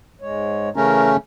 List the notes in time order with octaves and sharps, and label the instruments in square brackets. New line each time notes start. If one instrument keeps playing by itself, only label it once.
[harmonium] G#2 G#3 C#5
[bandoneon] C#3 A3 C#4 [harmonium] E3 A#4 A#5